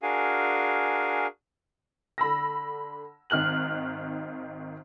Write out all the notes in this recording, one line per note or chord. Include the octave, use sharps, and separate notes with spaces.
D4 F#4 G#4 A#4 F5 G#5
D3 B5 E6 A#6
G#1 D#3 F6 F#6 F#7